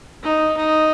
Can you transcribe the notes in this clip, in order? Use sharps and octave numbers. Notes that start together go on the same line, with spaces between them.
D#4
D#4